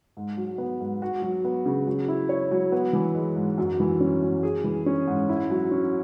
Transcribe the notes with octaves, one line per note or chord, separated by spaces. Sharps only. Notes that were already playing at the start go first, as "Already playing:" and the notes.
G#2
F#3
B3
G#2
F#4
F#3
B3
C#3
F#3
E4
C#5
F#3
B3
E3
G#3
G#2
F#2
E3
C#4
F#2
G#4
E3
C#4
G#2
E4
F#3
C#4